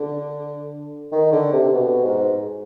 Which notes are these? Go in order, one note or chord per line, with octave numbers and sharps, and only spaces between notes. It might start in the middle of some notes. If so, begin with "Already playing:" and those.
Already playing: D3
D#3
D3
C3
B2
G#2